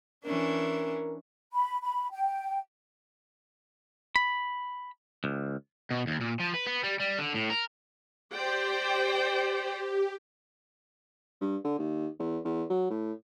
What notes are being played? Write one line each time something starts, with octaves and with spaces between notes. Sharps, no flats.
E3 C#4 D4 A#4
B5
B5
G5
B5
C#2
B2
D#2
A#2
F3
B4
B3
G3
G3
D3
A2
A#4
G4 C5 D5 G5
G2
D3
D#2
E2
E2
F#3
A2